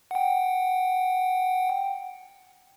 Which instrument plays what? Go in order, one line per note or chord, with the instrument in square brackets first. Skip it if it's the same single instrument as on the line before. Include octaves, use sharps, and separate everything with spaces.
[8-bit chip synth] F#5 G5